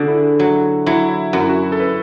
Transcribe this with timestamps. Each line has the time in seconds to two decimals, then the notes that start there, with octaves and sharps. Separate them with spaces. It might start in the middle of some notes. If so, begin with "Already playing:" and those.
Already playing: D3 F#4 G#4
0.08 E4
0.39 F#3 F#4
0.86 F#3 E4
1.33 F#2 F#4
1.40 E4
1.49 F#4
1.72 A4
1.80 B4